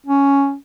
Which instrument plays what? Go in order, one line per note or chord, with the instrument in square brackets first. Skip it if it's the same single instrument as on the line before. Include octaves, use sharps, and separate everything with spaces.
[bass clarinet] C#4